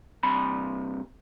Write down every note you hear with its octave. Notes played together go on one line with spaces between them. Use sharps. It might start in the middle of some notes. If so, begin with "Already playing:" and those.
G2 C3 B5